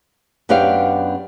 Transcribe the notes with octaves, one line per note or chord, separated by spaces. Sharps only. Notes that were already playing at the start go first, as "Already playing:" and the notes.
F#2 B3 D4 G4 C5 F5